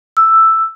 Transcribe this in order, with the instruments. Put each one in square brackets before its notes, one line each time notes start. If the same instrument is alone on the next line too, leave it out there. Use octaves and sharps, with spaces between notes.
[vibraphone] E6